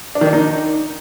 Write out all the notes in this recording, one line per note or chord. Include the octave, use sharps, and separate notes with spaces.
D4
D#3
D4
D#4